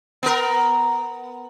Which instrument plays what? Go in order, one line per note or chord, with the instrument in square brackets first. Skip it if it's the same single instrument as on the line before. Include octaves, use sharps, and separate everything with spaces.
[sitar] B3 A#4